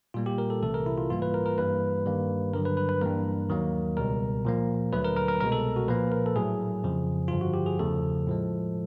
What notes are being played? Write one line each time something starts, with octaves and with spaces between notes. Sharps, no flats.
A#2 G3 A#3 F4
G4
A#4
A4
C2 C3 E3 A3 A4
A#4
E4
F4
G#2 E3 G3 A#3 F4
B4
A#4
A#4
G2 E3 G3 A#3 B4
G2 D#3 G3 A#3
G2 D3 F#3 A#4
B4
B4
B4
G2 E3 G3 A#3 A#4
D#2 D#3 F#3 A#3
C#2 B2 G3 A#4
A#2 F3 A#3
D2 D3 F#3 A3 B4
A#4
A#4
A#4
C2 B2 G#3 A#4
A4
F#4
A#2 F3 A#3 B4
A#4
A4
A2 F#3 A3 G#4
F2 C#3 F3
G2 D3 F3 F4
F#4
G4
G#4
E2 C#3 F3 A3 A4
A2 F3 G#3